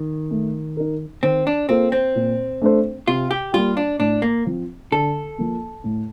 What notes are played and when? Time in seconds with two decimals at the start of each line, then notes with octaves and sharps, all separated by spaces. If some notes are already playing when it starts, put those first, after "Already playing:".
Already playing: D#3
0.31 A3
0.77 D#4 A#4
1.23 D#3 C4
1.47 D4
1.69 A#3 C4 F4 A4
1.92 C4
2.15 A#2
2.62 A3 D4 A4 C5
3.07 C3 F4
3.31 G4
3.54 G3 A#3 F4
3.77 D4
3.99 A2 D4
4.22 A#3
4.46 F3 C4
4.92 D3 A4
5.38 F3 A#3
5.84 A2